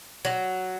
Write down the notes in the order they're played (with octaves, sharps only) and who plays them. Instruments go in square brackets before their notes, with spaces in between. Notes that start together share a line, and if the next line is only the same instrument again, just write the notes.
[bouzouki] F#3